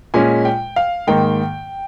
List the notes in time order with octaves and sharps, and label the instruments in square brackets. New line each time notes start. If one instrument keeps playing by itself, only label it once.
[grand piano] A#2 G#3 C#4 G#5
G5
F5
G#2 D#3 A#3 G5